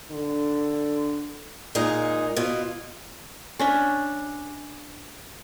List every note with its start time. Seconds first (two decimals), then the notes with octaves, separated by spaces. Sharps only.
0.11 D3
1.75 A#2 G#3 D#4 G#4
2.36 B2 E4 F4
3.59 C#4 D4 E5